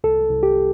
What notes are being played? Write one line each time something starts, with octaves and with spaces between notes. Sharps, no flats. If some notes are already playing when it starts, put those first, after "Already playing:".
C2 A4
C2
G4